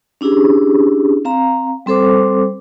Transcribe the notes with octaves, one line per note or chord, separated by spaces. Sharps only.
C#4 D4 E4 G4 G#4
C4 F5 A#5
G3 C4 A4 C5 D6